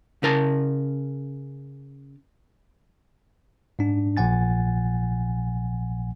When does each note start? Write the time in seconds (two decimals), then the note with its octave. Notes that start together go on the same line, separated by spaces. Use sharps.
0.23 C#3 A#4 A5
3.79 G#2 D4
4.17 A#1 A#2 F3 F#5 G#5 A6